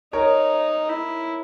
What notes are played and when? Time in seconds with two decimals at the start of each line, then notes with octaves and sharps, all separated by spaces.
0.13 D#4 A#4 C#5
0.89 E4